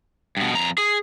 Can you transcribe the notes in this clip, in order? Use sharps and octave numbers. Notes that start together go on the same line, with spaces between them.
G2 B2
F2 A#5
G#4